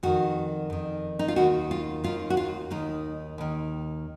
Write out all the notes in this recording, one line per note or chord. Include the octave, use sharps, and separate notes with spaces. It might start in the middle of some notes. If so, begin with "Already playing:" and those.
F2 D#3 F#4
F2 D#3
D#4
F4
D#2 D#3 F#4
F4
D#2 D#3 F4
F#4
F4
D#2 D#3 D#4
D#2 D#3